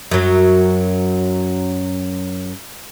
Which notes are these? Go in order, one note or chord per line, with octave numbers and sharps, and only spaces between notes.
F#2 F#3